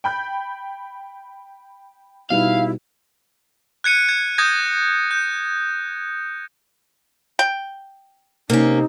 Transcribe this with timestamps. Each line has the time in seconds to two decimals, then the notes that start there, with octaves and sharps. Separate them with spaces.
0.04 G5 B5 G6
2.30 B2 G3 D#4 E4 F5
3.84 F#6 G#6 C#7 D#7
4.09 G#6
4.38 D#6 G6 G#6 A#6
5.11 G6
7.39 G5
8.50 C3 A#3 C#4 D#4